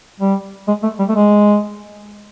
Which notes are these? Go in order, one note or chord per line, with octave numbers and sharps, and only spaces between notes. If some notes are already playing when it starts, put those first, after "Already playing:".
G3
G#3
A3
G3
A3
G#3